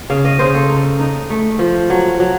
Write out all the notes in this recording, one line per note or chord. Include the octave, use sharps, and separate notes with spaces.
C#3 F5
D#5
C#3 C5
A4
D#4
D#4
A3
F3
F#3
F#3